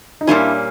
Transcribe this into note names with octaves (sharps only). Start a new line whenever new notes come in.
D#4
A#2 G3 A#3 C#4 D4 E4